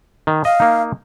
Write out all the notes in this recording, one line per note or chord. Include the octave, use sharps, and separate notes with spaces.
D#3
D#5 F5
A#3 D#4